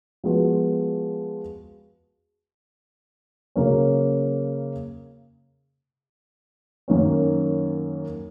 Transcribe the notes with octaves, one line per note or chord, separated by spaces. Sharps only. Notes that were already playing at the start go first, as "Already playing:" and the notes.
F3 G#3 B3 F#4
C#3 F#3 A#3 C#4
F#2 D#3 A#3 C#4